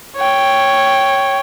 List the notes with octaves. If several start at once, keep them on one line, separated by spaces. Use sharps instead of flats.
C#5 G5